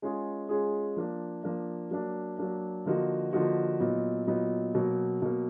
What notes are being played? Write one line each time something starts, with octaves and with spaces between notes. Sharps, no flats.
G#3 C#4 F4 G#4
G#3 C#4 F4 G#4
F3 A#3 D4
F3 A#3 D4
F#3 A#3 D4
F#3 A#3 D4
D3 F3 A#3 D#4 F#4
D3 F3 A#3 D#4 F#4
A#2 F#3 B3 D#4
A#2 F#3 B3 D#4
B2 F#3 A#3
B2 F#3 A#3